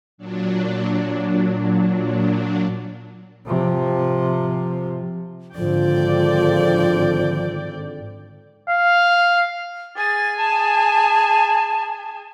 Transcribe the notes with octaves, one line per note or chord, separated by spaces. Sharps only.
A#2 F#3 D4
C3 F3
G#1 D3 F3 D5 G5
F5
G#4 G#5 A6
A5